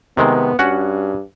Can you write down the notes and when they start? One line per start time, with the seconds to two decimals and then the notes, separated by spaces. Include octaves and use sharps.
0.17 C3 D#3 G#3 B3
0.59 G2 C#4 F#4 F#5